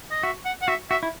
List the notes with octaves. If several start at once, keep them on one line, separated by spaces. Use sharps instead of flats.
D#5
F#4 E5
F#5
F#5
F#4 E5
F#4 E5
E4